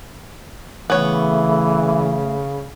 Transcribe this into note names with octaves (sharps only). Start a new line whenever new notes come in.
C#3 E3 A3 B3 C#5